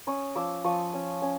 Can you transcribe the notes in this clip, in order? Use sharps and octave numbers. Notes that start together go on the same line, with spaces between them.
C#4 C#6 D#6
F3 D6 E6
F3 C#6 D#6
C#4
C#4